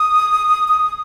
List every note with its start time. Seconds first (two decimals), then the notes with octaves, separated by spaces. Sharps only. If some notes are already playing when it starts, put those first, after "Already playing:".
Already playing: D#6
0.68 D#6